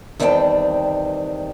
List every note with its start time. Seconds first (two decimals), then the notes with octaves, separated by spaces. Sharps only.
0.20 E2 D#3 G3 C4 G5 A5